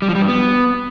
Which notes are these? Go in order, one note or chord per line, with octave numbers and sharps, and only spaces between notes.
G3
F3
G3
G2
B3